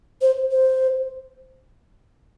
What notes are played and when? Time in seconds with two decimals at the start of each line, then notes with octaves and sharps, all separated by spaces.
0.21 C5
0.51 C5